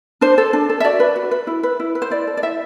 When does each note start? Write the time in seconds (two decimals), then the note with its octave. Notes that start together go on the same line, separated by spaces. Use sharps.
0.21 D4 C5
0.38 A4
0.53 D4
0.69 A4
0.80 E5
0.85 F#4 D5
1.00 B4
1.16 F#4
1.31 B4
1.47 E4
1.63 B4
1.80 E4
1.95 B4
2.02 C5
2.11 E4 D5
2.27 A4
2.37 D5
2.43 E4 E5